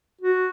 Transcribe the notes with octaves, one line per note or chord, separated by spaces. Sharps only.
F#4